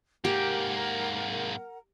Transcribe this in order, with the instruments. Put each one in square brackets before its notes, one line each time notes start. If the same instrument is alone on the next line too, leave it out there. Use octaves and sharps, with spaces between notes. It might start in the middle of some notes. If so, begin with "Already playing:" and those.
[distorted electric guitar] G#2 A#3 [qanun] G4 [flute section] A#4 F#5 A#5